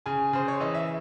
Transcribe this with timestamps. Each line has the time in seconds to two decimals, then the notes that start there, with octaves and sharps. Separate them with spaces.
0.06 C#3 G#5
0.33 C#3 C5
0.48 C#5
0.60 E3 D#5
0.74 E5